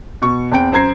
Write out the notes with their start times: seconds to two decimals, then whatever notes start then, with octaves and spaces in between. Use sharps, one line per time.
0.22 B2 C#6
0.52 E2 C4 G5 D7
0.72 F#2 C5 A#5 G#6 C7